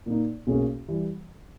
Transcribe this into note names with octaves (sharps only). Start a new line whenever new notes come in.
A#2 A#3 D#4
B1 B2 A#3 C#4 G#4
E3 G3